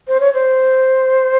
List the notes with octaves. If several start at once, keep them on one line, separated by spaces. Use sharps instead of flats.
C5
C#5
C5